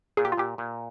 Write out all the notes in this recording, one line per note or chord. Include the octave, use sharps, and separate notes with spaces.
A#2 G#4
G4
F4
A#2 G4
A#2